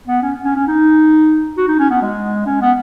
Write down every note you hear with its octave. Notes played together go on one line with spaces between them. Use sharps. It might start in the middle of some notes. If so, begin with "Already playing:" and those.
B3
C#4
C#4
C#4
D#4
F#4
D#4
C#4
B3
G#3
C#4
B3